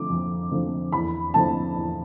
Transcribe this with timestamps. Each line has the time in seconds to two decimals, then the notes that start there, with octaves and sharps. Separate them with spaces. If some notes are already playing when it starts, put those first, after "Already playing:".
Already playing: D3 F3 A3 C4 D6
0.09 F2
0.51 D3 F3 A3 C4
0.92 E2 B5
1.34 D3 F3 A3 C4 A5
1.75 E2